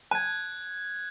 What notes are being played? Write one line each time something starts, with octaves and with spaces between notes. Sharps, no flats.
A5 F#6 G#6